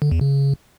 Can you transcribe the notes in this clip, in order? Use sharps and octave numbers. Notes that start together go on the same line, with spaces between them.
D3
E2
C#3